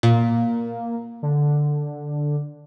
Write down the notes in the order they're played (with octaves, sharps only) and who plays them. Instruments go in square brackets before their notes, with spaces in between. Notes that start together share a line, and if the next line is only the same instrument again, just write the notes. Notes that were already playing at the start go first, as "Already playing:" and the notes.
[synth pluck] A#2 [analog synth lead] A#3
[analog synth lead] D3